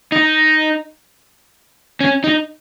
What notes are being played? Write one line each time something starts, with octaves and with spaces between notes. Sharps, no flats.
D#4
C#4
D#4